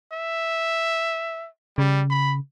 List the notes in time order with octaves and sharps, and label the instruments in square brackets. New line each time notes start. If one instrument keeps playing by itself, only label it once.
[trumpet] E5
[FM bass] C#3 [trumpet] G3
[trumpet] B5